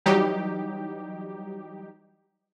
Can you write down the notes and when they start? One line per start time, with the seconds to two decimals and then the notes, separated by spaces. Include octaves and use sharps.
0.06 E3 F#3 G3 D#4 G4